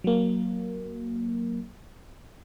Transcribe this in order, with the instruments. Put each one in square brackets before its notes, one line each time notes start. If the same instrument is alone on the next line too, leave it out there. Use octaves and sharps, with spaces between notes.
[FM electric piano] F#3 A#3